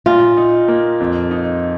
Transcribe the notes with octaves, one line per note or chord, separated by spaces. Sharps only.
A#2 F4
D#4
A#3
F2
D#4